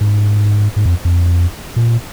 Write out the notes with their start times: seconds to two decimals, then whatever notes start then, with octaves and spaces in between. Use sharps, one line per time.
0.01 G#2
0.76 G#2
0.85 F2
1.05 F2
1.76 A#2